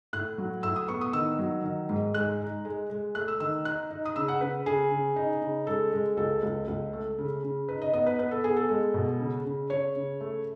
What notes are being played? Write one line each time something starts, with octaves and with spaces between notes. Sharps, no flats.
A2 F#6
F#3
A2 E6
D#6
B3 C#6
D#6
D#3 E6
F#3
D#3
G#2
G#3 F#6
D#4
G#3
G#3
A3 F#6
E6
D#3 E6
D#4 F#6
D#4
D#6
C#3 E6
F#5
C#3 B4
C#3 G#4
C#3
D#4
C#3
G#3 A4
G#3
C#2 A4
C#2
C#2
A3
C#3
C#3
D#4 B4
D#5
B3 D#5
B4
B3 B4
A4
B3 G#4
A4
G#3
B2
C#3
C#3
C#3 C#5
C#3
A3